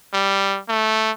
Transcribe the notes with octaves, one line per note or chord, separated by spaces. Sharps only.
G3
A3